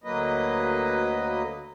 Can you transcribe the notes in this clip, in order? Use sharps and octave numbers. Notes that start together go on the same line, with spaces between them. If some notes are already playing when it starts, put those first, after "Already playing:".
D2 F#3 A#3 B4 D#5